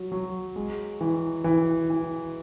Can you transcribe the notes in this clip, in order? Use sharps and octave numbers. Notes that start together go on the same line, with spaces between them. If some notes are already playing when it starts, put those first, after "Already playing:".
Already playing: F#3
F#3
G#3
E3
E3
E3